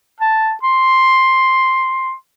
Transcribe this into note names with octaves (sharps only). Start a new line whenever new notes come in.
A5
C6